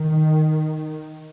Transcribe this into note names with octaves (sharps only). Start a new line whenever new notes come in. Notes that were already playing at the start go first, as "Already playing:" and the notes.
Already playing: D#3